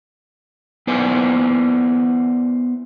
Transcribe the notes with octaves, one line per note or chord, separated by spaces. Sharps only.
B3 E4 C5 D5 G#5